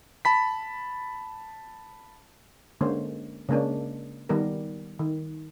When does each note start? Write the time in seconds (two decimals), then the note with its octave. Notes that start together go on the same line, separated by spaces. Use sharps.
0.25 A5 B5 B6
2.81 D3 G#3 A#3 C#4 C5
3.49 C#3 G#3 A#3 C#4 D4
4.29 D#3 G3 B3 A#4
4.99 D#3